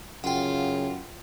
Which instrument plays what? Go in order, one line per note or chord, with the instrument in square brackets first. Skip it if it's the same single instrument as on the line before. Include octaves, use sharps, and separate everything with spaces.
[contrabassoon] F#2 [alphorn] C#3 [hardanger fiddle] F4 [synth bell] F#5 G5